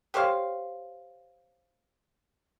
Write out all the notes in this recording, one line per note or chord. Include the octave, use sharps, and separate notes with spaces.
G4 C5 C#5 F5